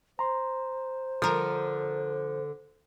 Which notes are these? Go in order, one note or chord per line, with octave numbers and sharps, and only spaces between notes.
C5 A#5 C6
D3 F3 A#4